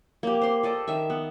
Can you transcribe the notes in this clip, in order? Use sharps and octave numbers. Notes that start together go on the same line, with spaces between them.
A#3 G4
C5 C6
A4 D5 D#5
D#3 E5
B3